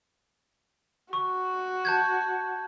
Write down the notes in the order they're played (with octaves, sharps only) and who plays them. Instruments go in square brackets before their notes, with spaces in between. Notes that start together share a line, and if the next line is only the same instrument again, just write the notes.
[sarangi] F#4 [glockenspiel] C#6
[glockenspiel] A5 G6 G#6